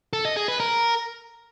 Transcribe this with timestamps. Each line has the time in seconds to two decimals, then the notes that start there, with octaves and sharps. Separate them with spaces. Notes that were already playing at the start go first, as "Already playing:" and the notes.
0.13 A4
0.25 D#5
0.37 G#4
0.48 B4
0.60 A#4